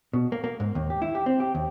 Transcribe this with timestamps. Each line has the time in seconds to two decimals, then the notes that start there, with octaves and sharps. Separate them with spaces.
0.13 B2
0.32 A#3
0.44 A#3
0.60 G#2
0.75 D#2
0.90 G4
1.02 E4
1.15 G4
1.26 C4
1.40 G4
1.55 D#2